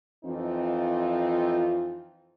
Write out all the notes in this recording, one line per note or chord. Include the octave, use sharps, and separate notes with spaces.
F2 E3 C4 D#4 F4